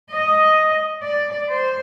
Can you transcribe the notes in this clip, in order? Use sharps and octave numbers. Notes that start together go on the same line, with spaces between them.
D#5
D5
C5